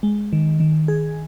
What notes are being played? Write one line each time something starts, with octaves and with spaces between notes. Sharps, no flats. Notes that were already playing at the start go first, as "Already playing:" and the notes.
G#3
D#3
D#3
G#4